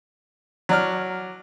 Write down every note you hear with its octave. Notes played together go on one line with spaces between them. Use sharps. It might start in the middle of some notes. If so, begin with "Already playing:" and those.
F#3 D5 F6